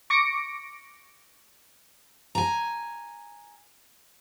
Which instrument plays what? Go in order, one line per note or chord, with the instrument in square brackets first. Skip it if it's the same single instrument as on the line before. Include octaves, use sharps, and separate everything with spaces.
[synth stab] C#6 D6 A#6 C#7 D7
[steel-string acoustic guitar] G#5 A#5